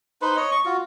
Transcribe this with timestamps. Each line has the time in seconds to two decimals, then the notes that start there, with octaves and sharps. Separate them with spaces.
0.22 D#4 B4 C5
0.36 C#5 D#5
0.51 C#6
0.66 F4 F#4